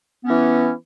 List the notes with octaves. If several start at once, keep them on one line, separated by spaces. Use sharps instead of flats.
E3 B3 C#4